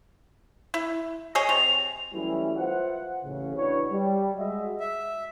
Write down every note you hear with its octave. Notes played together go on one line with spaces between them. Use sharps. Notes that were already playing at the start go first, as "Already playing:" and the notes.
E4
G#4 C#5 D#5
C3 F7
E3 F#3 G3 A3 C#4 E4
F4 B4 C5 E5 F#5
A1 C#3
D4 E4 F#4 B4 C#5
G3
G#3 F#4 D#5 E5
E5